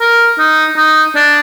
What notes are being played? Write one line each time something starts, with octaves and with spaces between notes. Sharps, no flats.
A#4
D#4
D#4
D4